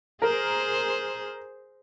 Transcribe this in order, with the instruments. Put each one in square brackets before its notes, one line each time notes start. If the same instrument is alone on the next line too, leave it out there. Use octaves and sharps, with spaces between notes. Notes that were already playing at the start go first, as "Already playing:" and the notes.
[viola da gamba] G#4 C5 [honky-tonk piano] A#4